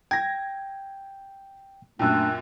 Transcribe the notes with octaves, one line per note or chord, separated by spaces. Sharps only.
G5 G#6 A#6
F#2 A#2 A3 D4 G5 E6 F#6